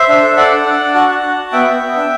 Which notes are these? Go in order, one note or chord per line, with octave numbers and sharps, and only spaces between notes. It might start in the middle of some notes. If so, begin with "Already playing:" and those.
Already playing: C5 E5
D4
A4
A4 D5 F#5
D4
D4
D4
F#4 F#5 A5
D4
F#4
F#4
B3 E5 G5
B3
B3
D4